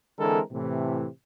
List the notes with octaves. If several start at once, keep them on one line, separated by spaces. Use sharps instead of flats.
D3 E3 G#3 C4 A4 A#4
A2 C3 E3